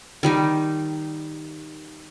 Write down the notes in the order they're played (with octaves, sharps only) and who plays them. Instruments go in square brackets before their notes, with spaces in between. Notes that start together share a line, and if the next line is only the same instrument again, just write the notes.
[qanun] D#3 G3 D#4